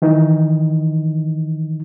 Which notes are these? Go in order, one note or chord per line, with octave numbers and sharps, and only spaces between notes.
D#3 E3 D#4